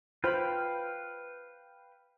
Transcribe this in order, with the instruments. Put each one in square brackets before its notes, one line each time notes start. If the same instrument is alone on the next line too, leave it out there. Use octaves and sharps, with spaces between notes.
[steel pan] F4 C5 B5 [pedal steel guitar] B4 F5 G5